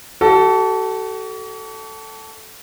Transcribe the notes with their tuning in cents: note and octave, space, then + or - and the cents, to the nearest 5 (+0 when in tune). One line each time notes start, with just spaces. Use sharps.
F#4 +45 A4 +0